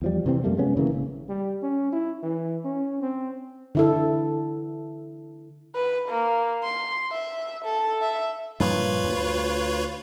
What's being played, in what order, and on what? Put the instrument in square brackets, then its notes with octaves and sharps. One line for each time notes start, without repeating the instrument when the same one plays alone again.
[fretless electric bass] E2 F3 G3
C3 E3 F3 C4
F#2 G3 A3 A#3
C3 G#3 B3 C#4
C#3 E3 A#3
A1
[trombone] G3
C#4
E4
E3
C#4
C4
[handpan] D3 E4 A4
[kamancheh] B4
A#3
C6
E5
A4
E5
[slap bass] G2 A#2 F3 [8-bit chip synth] F4 B4 C#5
[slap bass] D2